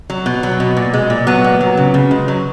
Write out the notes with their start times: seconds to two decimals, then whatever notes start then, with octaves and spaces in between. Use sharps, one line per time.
0.10 F#3
0.26 B2
0.43 F#3
0.60 B2
0.77 A#2
0.93 G#3
1.10 A#2
1.27 F#3 B3
1.44 A#2
1.61 F#3
1.77 C#3
1.94 C#3
2.11 G#3
2.28 F#3